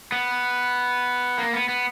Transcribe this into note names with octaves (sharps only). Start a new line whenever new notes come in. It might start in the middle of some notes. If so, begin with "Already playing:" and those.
B3
A#3
B3
B3